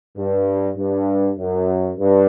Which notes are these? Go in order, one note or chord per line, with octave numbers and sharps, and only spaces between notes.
G2
G2
F#2
G2